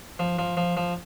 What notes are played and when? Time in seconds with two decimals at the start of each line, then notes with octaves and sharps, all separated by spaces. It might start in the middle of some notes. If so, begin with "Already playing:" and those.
0.19 F3
0.39 F3
0.57 F3
0.77 F3